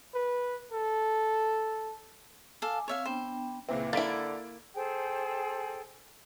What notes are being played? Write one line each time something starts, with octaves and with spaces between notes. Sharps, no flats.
B4
A4
A4 F5 G#5 D6
C4 C#5 E5 F5
B3 D4 C5 G5
C#2 A#2 E3 C4
D3 A#3 E4 A6 B6 D7
G#4 A4 C5 G5